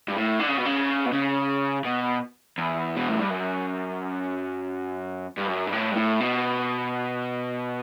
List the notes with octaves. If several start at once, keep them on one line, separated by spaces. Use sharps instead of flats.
G2
A2
D3
C#3
B2
C#3
B2
C#3
B2
E2
B2
A2
G2
F#2
G2
F#2
G2
A2
G2
A2
B2